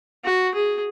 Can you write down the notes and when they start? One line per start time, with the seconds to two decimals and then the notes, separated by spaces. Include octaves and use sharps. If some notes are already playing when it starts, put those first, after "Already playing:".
0.24 F#4
0.55 G#4